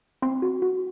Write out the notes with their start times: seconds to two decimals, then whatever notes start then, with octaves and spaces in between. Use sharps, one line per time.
0.22 C4 C6
0.42 F#4
0.62 F#4